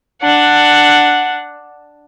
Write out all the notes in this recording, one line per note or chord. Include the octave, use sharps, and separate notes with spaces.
D4 F#5